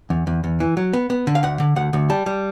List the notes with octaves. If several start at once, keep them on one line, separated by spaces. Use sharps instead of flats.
E2
E2
E2
E3
F#3
B3
B3
D3
F5
D2 F#5
D3
D2 F#5
D2
G3 A5
G3